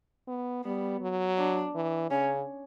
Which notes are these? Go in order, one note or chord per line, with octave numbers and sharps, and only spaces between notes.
B3
G3 B3
F#3
D4
E3
C#3 C#4